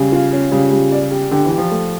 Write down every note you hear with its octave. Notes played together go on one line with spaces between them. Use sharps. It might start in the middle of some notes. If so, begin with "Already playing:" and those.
Already playing: C#3 G3
F4
C#4
C#3 G3
G3
D5
G4
D3 G4
E3
G4
F3
A3